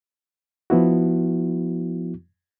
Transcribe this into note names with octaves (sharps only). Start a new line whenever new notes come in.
F3 B3 E4 F#4